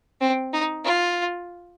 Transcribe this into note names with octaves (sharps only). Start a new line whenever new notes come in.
C4
D#4
F4